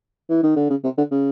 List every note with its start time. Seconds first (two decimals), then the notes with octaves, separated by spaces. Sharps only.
0.30 E3
0.43 D#3
0.56 D3
0.70 C#3
0.84 C3
0.98 D3
1.11 C#3